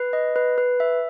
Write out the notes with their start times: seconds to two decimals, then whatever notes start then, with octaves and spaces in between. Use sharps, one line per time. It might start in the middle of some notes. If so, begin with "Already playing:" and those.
Already playing: B4
0.13 D#5
0.36 B4
0.58 B4
0.80 E5